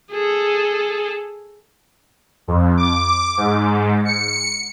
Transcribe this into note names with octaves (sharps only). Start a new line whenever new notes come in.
G#4 A4
F2
D6
G#2
C#7